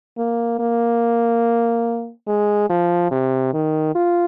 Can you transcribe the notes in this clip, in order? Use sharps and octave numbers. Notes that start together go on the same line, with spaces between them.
A#3
A#3
G#3
F3
C3
D#3
F4